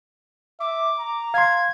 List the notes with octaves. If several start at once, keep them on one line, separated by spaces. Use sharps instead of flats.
E5 D6
A#5
F5 C6 G#6